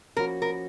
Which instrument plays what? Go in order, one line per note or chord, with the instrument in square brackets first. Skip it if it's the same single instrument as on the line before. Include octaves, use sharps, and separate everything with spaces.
[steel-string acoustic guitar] F3 A#3 C#4 F#4 [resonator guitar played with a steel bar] A#4
[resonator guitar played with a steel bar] A#4